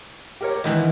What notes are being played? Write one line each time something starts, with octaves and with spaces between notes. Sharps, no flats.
G4 A#4 C#5
B1 D#3 E3 E4 D#5